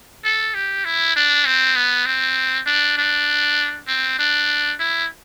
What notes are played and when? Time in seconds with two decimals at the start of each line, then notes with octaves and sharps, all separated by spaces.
0.25 A4
0.55 G4
0.85 E4
1.16 D4
1.46 C4
1.76 B3
2.06 C4
2.66 D4
2.97 D4
3.87 C4
4.19 D4
4.80 E4